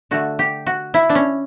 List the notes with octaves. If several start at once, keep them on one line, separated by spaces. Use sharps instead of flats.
D3 A3 F#4
G4
F#4
E4
D4
C#4